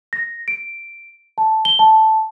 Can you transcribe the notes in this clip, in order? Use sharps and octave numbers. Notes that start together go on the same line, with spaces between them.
A#6
D7
A5
G7
A5